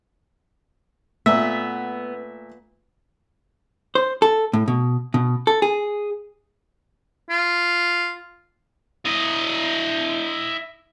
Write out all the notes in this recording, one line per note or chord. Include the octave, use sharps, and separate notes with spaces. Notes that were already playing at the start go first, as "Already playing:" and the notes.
A#2 A3 B3 E5
C5
A4
A2
B2
B2
A4
G#4
F4
E4 D#5